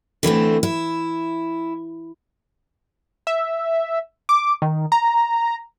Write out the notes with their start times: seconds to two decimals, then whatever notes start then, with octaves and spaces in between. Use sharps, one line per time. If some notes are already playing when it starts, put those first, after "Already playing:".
0.23 D3 E3 A3 C4
0.63 E4
3.27 E5
4.29 D6
4.62 D#3
4.92 A#5